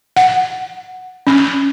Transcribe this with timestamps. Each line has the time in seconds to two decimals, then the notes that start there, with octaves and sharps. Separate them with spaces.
0.16 F#5
1.27 C#4